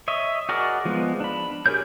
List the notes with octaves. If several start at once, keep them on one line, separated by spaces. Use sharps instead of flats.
C#5 D#5 E5
F#4 G#4 A#4 D5 D#5
F3 G#3 B3
D4 B5
G4 G#4 A#4 C#5 G6